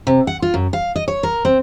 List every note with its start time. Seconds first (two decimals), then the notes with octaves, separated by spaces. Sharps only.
0.07 C3
0.27 F#5
0.42 F4
0.54 F#2
0.73 F5
0.96 D#5
1.08 C#5
1.23 A#4
1.45 C4